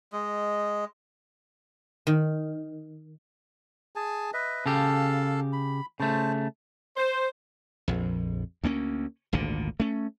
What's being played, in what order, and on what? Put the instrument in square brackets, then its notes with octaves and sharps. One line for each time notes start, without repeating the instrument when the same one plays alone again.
[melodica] G#3 D#5
[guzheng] D#3
[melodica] G#4 G#5 A5
B4 D#5 E5
[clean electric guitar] C#3 G4 [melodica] A4 F5 A5
[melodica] B5
[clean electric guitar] C#3 A3 [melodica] C5 A5
[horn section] C5
[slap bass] A#1 F2
D2 A#3 C#4
G#1 D2 A#2 D3
A3 C#4